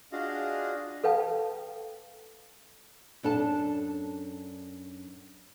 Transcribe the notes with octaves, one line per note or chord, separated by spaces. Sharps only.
D4 F4 F#4 G#4 D#5 F5
A4 B4 F5 G5 A5
F#2 D4 A4 A5